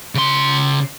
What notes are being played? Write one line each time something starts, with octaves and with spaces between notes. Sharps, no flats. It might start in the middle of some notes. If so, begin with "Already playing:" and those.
C#3 C6